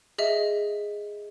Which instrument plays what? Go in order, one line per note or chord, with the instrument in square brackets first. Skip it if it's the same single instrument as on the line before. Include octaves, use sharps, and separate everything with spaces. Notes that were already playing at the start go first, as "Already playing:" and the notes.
[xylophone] G#4 D#5 E5